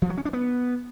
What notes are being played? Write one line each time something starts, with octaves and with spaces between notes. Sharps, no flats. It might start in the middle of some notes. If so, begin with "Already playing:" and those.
F3
F#3
C#4
D4
B3